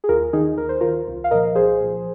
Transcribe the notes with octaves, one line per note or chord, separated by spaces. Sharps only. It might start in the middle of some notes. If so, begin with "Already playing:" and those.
G#4
D#2 F4 A#4
D#3 D#4 G#4
D#2 A#4
C5
D#3 F4 A#4
C2
F5
A#2 F3 A#4 D#5
C2 G#4 C5
A#2 F3